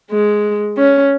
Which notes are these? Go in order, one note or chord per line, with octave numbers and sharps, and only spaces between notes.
G#3
C#4